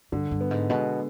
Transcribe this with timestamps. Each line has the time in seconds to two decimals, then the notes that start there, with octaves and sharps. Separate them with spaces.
0.12 G2 D3
0.31 G2
0.41 B3
0.51 G#2
0.69 B2 G#3